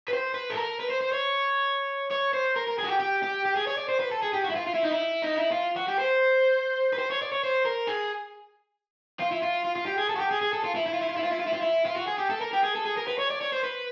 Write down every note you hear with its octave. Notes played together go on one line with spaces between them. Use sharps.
B4
C5
B4
A4
A#4
B4
C5
C5
C#5
C#5
C5
A#4
A#4
G#4
F#4
G4
G4
G4
G4
G#4
C#5
D5
C5
B4
A4
G#4
G4
F#4
E4
F4
F4
E4
D#4
E4
D#4
E4
F4
F#4
G4
C5
B4
C5
C#5
D5
C#5
C5
A#4
G#4
F4
E4
F4
F4
F4
G4
G#4
A4
F#4
G4
G#4
G#4
A4
F4
E4
E4
F4
E4
F4
E4
F4
E4
F4
E4
F4
E4
F4
F#4
G#4
G4
A4
A#4
G4
G#4
A4
G#4
A#4
B4
C#5
D5
C#5
C5
B4